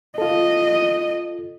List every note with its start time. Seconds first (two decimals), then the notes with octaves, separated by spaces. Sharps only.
0.18 F4 A4 D#5